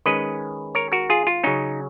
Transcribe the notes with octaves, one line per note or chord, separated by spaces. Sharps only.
D#3 G#3 C#4 B4 D#5
A#4 C#5
F#4 A#4
F4 G#4
F4
C#3 F#3 C#4 D#4